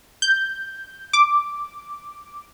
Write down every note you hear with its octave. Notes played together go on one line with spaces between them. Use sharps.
G6
D6